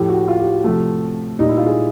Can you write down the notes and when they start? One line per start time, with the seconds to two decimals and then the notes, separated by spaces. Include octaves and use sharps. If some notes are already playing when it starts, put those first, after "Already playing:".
Already playing: A2 F3 A3 G4
0.09 F#4
0.28 F4
0.40 G4
0.53 F#4
0.64 C3 F3 A3
1.39 A#2 G3 D#4
1.48 E4
1.57 F4
1.66 G#4